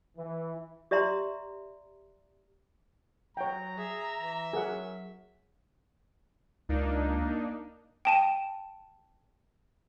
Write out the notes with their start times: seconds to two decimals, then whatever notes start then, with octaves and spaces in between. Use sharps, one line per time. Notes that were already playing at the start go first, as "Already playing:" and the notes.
0.16 E3
0.91 G4 D5 E5 A#5 C6
3.37 F#3 C#5 F#5 G5 A#5
3.78 G#4 E5
4.19 E3
4.53 F#3 G#4 A#4 F#5
6.69 C#2 A#3 D4 D#4
8.05 G5 A5 D#7